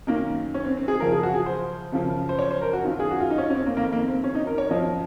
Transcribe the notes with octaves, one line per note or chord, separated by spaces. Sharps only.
F#2 D#3 A#3
C#4
C4
C4
G#4
F#2 C#3 F3 A#4
G#4
F#4
G#4
C5
F#2 C#3 F3
C5
C#5
C5
A#4
F#4
F#2 D#3 F4
G#4
F#4
F4
D#4
C#4
D#4
C#4
C4
A#3
F2 D#3 A#3
A#3
C4
C#4
D#4
A#4
C#5
F#2 F3 D#5